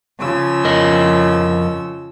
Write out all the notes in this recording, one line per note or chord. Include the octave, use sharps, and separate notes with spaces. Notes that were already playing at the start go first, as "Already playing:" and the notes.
C#3 F3 E6
F2 A#4 D#5